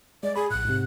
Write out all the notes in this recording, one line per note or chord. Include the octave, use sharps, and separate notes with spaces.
G#3 D5
G#4 B5
A#1 A2 F#6
G#2 C3